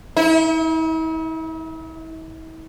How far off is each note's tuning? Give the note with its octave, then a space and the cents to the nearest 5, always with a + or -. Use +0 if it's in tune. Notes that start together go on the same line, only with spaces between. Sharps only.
E4 -45